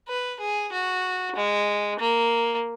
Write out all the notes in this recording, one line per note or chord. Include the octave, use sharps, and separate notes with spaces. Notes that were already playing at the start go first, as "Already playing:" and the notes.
B4
G#4
F#4
G#3
A#3